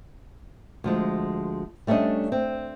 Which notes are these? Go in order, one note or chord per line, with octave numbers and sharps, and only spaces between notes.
D2 F3 G#3
G3 A3 C#4 D4 D#5
C4